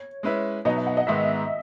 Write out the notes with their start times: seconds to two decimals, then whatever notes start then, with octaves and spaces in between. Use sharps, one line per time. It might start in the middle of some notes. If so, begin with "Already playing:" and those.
Already playing: C#5
0.23 G#3 C#4 E4 B4 E5
0.65 B2 F#3 B3 D#4 D#5
0.76 E5
0.86 F#5
0.97 D#5
1.07 G#2 D#3 G#3 B3 E5